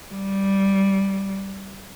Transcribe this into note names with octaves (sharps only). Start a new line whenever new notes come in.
G3